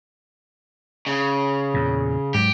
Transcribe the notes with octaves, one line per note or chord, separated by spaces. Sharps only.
C#3
E2 A#2
G#2 F#3 G4